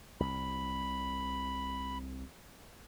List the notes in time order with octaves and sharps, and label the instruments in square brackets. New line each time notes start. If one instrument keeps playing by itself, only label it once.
[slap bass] C2 [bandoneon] B5